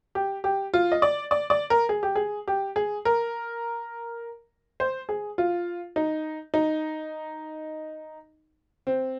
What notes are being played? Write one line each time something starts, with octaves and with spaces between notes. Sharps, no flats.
G4
G4
F4
D#5
D5
D5
D5
A#4
G#4
G4
G#4
G4
G#4
A#4
C5
G#4
F4
D#4
D#4
C4